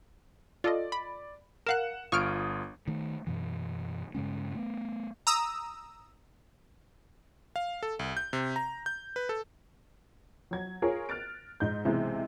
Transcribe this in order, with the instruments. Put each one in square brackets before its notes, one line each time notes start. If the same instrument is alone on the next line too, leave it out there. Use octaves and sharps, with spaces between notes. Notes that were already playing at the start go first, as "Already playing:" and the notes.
[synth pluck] F4 A4 D#5 [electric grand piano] D5
[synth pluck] B5
[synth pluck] A#4 F5 F#6 [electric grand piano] F#5 E7
[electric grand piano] G1 F4 D#6 [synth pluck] C#6 F6 D7
[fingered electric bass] D#3 A3
F#2 B2 E3
G2 C#3 G#3 C#4
A3 B3
[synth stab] A#5 D#6 E6
[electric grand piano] F5
A4
C2
G6
C3
A#5
G6
B4
A4
[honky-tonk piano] F#3 G#6
F4 G#4 A#4 C#5
F6 F#6 A6 D7
G#2 D#5 G6
B1 C3 E3 G#3